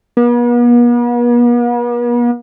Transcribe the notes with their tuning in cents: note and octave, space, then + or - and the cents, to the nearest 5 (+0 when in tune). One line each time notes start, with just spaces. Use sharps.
B3 -45